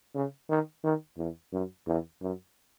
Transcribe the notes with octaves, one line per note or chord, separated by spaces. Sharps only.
C#3
D#3
D#3
E2
F#2
E2
F#2